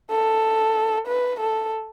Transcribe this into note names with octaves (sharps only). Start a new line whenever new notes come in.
A4
B4
A4